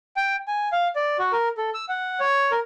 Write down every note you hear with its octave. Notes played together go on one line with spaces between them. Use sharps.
G5
G#5
F5
D5
F#4
A#4
A4
E6
F#5
C#5
A#4